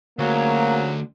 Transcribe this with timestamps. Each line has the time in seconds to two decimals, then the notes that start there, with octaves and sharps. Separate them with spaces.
0.19 D2 C#3 F3 F#3 A#3